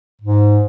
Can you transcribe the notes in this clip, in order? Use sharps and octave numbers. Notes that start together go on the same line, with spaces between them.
G#2